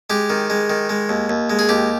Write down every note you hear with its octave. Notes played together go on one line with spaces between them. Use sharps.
G#3 G4
D#3
G#3
D#3
G#3
D#2
D#2
G#3
G#4
D#2 G4